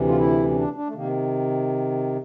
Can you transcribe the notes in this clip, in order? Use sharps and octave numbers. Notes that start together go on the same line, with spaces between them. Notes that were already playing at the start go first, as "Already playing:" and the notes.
Already playing: D2 C3 E3
F4
E4
C#4
D4
D4
A3
C3 D#3 A#3